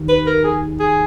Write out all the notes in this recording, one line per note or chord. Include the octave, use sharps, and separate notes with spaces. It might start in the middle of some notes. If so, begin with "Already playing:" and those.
Already playing: D#2 D#3
B4
A#4
G#4
G#4